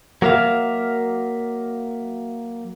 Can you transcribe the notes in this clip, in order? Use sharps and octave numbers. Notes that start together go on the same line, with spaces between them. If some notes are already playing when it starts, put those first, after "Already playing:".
F#3 A#3 A#4 E5 F5